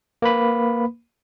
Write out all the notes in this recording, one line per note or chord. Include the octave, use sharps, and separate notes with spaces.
A#3 B4 B5